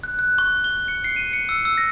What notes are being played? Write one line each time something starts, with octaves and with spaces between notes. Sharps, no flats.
F#6
F#6
C#6
G7
C#7
C7
D#7
C#7
E6
E6
A#6